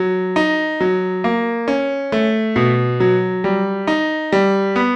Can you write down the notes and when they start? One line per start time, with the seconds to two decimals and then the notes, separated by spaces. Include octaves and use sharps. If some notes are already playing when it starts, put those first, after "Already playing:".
Already playing: F#3
0.36 D#4
0.81 F#3
1.24 A#3
1.68 C#4
2.12 A3
2.56 B2
3.00 F#3
3.44 G3
3.87 D#4
4.32 G3
4.76 B3